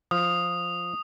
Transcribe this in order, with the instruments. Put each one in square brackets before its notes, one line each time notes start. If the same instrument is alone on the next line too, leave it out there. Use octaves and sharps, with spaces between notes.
[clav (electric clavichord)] F3 [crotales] D#6